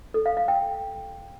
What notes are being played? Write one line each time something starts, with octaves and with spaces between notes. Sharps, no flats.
A4
F5
F5
G5